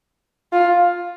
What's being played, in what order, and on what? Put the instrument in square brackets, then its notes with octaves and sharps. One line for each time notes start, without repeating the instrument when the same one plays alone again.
[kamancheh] F4